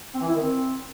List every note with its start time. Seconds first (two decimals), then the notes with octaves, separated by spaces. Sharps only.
0.14 C4
0.21 E3
0.28 E4
0.35 D#3
0.41 C4